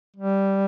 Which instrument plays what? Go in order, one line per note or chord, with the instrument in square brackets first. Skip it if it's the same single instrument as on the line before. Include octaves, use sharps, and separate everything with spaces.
[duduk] G3